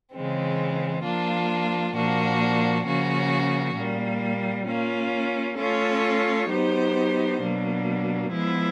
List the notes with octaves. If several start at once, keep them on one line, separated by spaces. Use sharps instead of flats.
C#3 E3 G#3 C4
F3 A#3 D4 F4
A#2 F3 A#3 D4 F#4
C#3 F3 A#3 C#4 F#4
A#2 G3 A#3
A#3 C#4 F4
A3 C#4 F4 A4 C#5
F#3 B3 D#4 G4 C5
B2 F#3 A#3 D4
F3 G#3 B3 E4